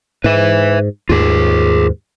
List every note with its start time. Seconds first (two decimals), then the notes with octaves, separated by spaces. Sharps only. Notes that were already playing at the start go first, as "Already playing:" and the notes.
0.24 G#2 B4 E5
1.09 D#2 G#2 F4 G#4